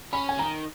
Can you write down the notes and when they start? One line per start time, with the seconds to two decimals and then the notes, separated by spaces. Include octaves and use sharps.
0.13 C#4 B5
0.29 G#5
0.38 D#3 A#5